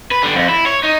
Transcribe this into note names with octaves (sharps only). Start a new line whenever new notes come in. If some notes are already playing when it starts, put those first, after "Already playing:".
B4
D3 G3
F2
E4
C#5
D#4